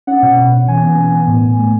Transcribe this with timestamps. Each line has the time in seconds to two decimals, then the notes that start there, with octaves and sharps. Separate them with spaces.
0.07 C#4 F#5
0.23 B2
0.37 B2
0.52 C#4
0.68 E3 G#5
0.83 B3
0.98 B3
1.13 B3
1.27 A2
1.43 A2
1.58 A3